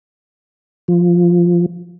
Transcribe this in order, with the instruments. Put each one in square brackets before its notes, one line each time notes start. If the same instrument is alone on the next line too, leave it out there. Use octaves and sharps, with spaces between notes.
[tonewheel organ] F3